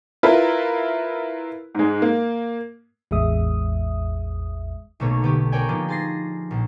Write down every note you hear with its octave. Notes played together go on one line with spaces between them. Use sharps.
E4 F4 A#4 B4
G#2 G#3
A#3
A1 E2 G#3 E5 D#6
B1 B2 A3 A#3 C#5
D3 B3 G4
A#4 C#5 D5 G5 G#5
F3 A#3 B3 D4 D#4
G#4 C6 A6 A#6 C7
A#1